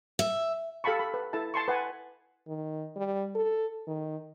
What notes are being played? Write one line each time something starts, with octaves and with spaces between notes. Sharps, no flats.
E5
G4 A4 F5 A5 B5 C#6
A4 B5
B4
E4 A4 E5 A5
A5 C6 C#6
B4 F#5 G#5
D#3
G3
A4
D#3